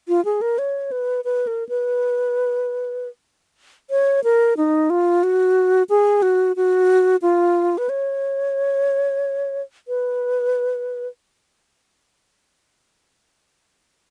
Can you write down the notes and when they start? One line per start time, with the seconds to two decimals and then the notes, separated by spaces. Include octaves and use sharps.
0.08 F4
0.25 G#4
0.41 A#4
0.58 C#5
0.92 B4
1.25 B4
1.47 A#4
1.69 B4
3.90 C#5
4.24 A#4
4.57 D#4
4.90 F4
5.23 F#4
5.90 G#4
6.22 F#4
6.56 F#4
7.22 F4
7.78 B4
7.89 C#5
9.88 B4